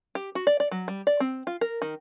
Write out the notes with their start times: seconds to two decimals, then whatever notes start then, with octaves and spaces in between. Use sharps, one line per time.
0.15 G4
0.35 F#4
0.47 D5
0.60 D5
0.71 F#3
0.88 G3
1.07 D5
1.20 C4
1.47 F4
1.61 A#4
1.82 D#3